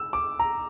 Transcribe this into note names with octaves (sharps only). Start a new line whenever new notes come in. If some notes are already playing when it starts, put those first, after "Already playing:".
Already playing: E6
D6
A#5